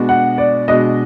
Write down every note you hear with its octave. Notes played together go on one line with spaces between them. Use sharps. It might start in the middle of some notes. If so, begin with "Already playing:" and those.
Already playing: B2 G#3 B3 D4 F#4
F#5
D5
B2 G#3 B3 D4 F#4 D#5